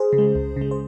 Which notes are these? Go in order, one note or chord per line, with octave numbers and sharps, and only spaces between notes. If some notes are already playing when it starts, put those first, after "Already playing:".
Already playing: G#4 C5
C#3
G#3
C#2
C#3 G#3
C5